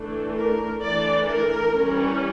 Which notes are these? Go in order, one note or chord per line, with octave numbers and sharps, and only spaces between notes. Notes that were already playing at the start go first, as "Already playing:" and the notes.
Already playing: E3 A3 D4
A#4
E3 A3 D4 D5
A#4
E3 G3 C#4